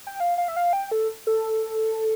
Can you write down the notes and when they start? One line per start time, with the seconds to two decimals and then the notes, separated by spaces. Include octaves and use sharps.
0.07 G5
0.20 F5
0.38 F5
0.48 E5
0.56 F5
0.73 G5
0.91 A4
1.27 A4